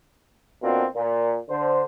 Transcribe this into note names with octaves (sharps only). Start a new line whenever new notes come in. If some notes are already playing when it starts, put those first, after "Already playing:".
B2 A#3 C4 D4 F4 F#4
A#2
D3 C5